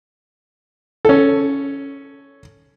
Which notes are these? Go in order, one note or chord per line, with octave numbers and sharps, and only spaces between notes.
C#4 A4